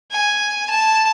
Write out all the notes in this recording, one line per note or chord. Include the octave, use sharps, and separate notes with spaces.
G#5
A5